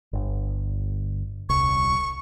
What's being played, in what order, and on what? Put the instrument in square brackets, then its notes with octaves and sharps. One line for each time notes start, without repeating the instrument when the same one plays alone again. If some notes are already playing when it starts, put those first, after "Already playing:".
[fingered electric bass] G1
[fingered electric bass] D#1 C2 [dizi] C#6